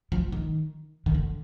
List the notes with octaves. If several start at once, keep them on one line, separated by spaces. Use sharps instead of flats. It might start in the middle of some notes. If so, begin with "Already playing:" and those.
F3
D#3
D#3
D3